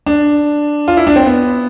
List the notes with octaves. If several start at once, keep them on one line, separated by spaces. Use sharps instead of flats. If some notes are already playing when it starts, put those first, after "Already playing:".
D4
F4
E4
D4
C4
B3